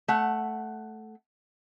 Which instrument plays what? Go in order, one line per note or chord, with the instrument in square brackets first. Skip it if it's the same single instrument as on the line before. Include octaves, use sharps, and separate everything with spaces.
[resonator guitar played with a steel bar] A3 F#5